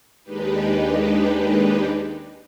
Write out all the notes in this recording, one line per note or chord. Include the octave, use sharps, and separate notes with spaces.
D#2 G#3 D4 D#4 G4 B4